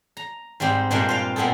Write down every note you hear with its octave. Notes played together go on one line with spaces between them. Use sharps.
A#5
G#2 G3 G#3 C4 G4
G2 A#2 G3 G#3 A#3 C4
F4 C5 F5 G5
A#2 G#3 B3 C4 G#4 A4